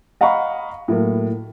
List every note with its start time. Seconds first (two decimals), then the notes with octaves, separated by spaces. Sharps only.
0.21 D#5 F5 F#5 A#5 B5 C#6
0.88 A2 F#3 A#3